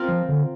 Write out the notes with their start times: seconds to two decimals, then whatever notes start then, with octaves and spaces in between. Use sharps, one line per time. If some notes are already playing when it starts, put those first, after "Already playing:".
Already playing: C4 F4 A#4
0.08 F3
0.29 D3